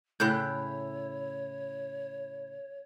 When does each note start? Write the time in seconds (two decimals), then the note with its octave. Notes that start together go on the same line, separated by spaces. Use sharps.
0.20 A2 C#3 E4 C#5 F#6 G6